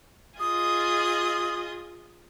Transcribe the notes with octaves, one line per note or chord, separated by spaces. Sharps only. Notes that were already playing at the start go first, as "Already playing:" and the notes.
F4 G#4 D#5 D#6